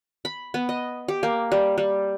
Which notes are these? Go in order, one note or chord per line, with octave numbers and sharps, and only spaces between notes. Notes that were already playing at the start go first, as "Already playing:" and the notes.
B5
B3
D#5
G4
A#3
G3
G3